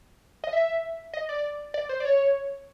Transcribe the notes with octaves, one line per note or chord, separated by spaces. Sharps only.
D#5
E5
D#5
D5
D5
C5
D5
C#5